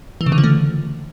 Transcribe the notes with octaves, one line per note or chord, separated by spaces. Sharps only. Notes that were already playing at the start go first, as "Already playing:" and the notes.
E3
C#3
D3
F3
A3